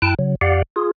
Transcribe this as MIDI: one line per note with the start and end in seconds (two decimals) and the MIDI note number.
0.02 0.15 42
0.02 0.15 64
0.02 0.15 79
0.02 0.15 81
0.02 0.15 90
0.19 0.35 49
0.19 0.35 54
0.41 0.62 41
0.41 0.62 67
0.41 0.62 74
0.41 0.62 77
0.41 0.62 78
0.76 0.91 65
0.76 0.91 68